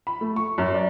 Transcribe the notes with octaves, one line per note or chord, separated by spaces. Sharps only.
B5
A3
C#6
F#2
D5